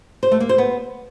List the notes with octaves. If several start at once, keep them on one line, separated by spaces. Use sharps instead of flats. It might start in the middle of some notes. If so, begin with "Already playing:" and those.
C5
A3
A#3
C5
B3